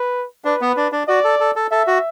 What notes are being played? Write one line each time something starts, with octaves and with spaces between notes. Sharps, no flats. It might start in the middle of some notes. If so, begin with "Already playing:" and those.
Already playing: B4
D4 B4
B3
D4
D4
F#4 D5
A4
A4
A4
A4 E5
F#4